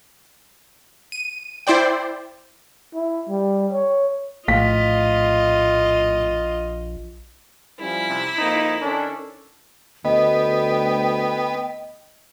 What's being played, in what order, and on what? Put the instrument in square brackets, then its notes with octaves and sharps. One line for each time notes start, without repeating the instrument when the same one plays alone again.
[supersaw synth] D#7
E4 C5 D5 G5
[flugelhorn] E4
G3
C#5
[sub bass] A#1 [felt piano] A2 F5 B6 [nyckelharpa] F4 D#5
[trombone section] F3 G3 C#4 [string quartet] E4
[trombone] C3
[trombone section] F2 A#3 C4 [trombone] D#4
[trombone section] D#3 C#4 A4 [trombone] D4
[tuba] D2 [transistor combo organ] B3 [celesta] D#5 [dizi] G5